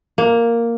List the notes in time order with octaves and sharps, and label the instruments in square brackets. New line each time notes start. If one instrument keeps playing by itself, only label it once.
[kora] A#3